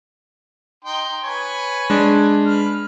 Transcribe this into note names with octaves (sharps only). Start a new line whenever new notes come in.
D#4 G5 C6
B4 C#5 G#5
G#3 D4
B4 F6